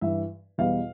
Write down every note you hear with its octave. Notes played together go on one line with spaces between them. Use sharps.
G2 E3 G3 E5
E2 B2 G3 F5